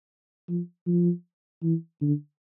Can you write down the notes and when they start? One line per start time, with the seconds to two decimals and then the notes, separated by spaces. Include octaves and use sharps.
0.49 F3
0.87 F3
1.63 E3
2.01 D3